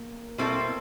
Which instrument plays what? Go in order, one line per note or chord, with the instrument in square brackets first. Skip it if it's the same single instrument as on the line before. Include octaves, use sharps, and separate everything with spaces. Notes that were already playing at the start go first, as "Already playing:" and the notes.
Already playing: [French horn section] A#3
[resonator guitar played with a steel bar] B2 G3 C4 E4 A4